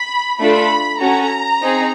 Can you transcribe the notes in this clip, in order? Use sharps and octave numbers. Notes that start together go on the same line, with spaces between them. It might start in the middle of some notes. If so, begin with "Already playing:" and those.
Already playing: B5
A3 D4 F4 A4 B5
C#4 F#4 A4 A#5
C4 D#4 G#4